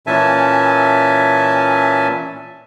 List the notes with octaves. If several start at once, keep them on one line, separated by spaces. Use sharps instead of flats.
A#2 E3 C#4 E5 G#5 A5